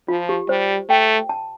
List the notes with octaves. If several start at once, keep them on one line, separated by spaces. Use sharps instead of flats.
F3 F4
G4
G3 C5
A3 G5
A5